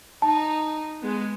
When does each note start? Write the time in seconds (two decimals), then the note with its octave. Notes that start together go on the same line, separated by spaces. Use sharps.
0.22 D#4 A5
1.02 G#3 B3